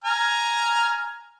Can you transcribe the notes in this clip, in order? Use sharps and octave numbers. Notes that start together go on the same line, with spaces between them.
G#5 A#5 F6